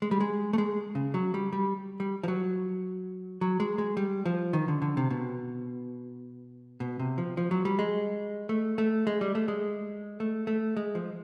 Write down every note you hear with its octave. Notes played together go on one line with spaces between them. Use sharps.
G#3
G3
G#3
A3
G#3
C#3
F#3
G3
G3
G3
F3
F#3
F#3
G#3
G#3
G3
F3
D#3
D3
D3
C3
B2
B2
C3
F3
F3
F#3
G3
G#3
A3
A3
G#3
G3
A3
G#3
A3
A3
G#3
F3